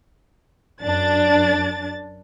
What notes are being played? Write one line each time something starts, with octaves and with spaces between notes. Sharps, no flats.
F#2 D4 A6